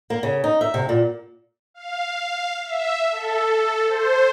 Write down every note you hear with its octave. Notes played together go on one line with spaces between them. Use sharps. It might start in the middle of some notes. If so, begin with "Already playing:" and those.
A#3
C#3
D#4
E5
C3
A#2
F5
E5
A4
C5